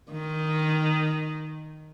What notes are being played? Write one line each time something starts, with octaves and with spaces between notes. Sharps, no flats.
D#3